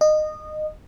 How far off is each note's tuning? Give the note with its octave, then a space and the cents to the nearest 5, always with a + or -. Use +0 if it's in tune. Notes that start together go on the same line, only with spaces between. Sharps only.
D#5 -20